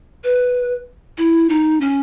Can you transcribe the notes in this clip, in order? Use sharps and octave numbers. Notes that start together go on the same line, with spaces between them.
B4
E4
D#4
C#4